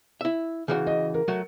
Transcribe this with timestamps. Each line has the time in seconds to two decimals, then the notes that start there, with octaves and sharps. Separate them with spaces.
0.21 E4 E5
0.68 C#3 E3 F#4
0.86 D#5
1.14 A#4
1.28 F#3 A3 F#4